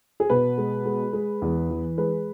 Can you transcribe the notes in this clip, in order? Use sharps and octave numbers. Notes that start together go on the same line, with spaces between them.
G#4
B2 B4
G#3
G#3
G#3
E2
E3
G#3 B4